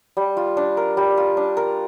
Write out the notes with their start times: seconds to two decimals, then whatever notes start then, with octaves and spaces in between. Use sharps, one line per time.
0.17 G3
0.37 F4
0.57 D4
0.77 A#4
0.97 G3
1.17 F4
1.37 D4
1.57 A#4